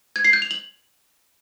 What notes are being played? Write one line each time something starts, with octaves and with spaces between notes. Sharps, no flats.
G#6
C7
G6
F7
F#7